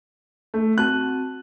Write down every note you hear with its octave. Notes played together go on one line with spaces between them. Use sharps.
A3
C4 F#4 A5 F#6